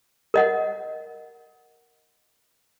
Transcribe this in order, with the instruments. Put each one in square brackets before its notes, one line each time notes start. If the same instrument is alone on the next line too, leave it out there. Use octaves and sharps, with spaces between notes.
[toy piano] A#4 D#5 F#5